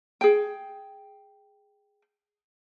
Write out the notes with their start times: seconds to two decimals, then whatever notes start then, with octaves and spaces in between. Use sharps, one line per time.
0.21 G#4 G5